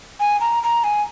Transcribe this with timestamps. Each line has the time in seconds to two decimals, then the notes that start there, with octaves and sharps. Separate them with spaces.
0.20 G#5
0.40 A#5
0.63 A#5
0.84 G#5